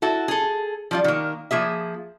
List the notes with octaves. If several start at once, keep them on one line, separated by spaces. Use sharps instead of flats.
E4 F#4 A4
G#4 A4
F3 G3 F4
D#3 A#3
F3 A#3 G#4 E5